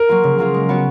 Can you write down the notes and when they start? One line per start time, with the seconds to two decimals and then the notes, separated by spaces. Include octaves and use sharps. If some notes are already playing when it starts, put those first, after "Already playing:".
Already playing: A#4
0.09 F#3 A#3 F4
0.24 C#3
0.38 F#3 A#3 F4
0.54 G#3
0.69 B3 F#4 C#5